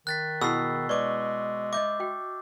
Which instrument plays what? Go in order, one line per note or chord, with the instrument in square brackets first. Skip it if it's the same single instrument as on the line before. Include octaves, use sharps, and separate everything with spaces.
[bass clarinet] D#3 [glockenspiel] F#6 A6 B6
[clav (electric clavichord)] B2 [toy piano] E4 G#4 [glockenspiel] E6 C7
[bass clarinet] G#3 [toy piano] B4 D5 [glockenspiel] C#6 D6
[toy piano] D#5 E5 [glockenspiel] D6 G6
[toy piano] F#4 G5